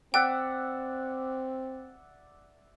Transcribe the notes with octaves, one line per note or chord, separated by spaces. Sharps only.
C4 D5 E5 F#5 G5